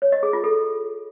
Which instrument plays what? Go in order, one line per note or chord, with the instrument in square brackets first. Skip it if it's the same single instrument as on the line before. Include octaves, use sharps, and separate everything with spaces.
[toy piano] C#5
D#5
G#4
F4
A4